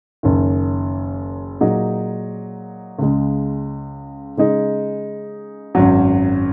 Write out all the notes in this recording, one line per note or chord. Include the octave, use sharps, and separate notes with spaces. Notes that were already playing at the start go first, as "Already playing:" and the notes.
F#1 F#2 D#3
A#2 F#3 D#4 G#4
C#2 C#3 G#3
C#3 G#3 D#4 G#4
G#1 F#2 F#3